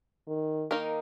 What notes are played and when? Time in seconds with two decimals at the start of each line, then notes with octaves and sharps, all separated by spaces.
0.27 D#3
0.71 D#3 A#3 D#4 A#4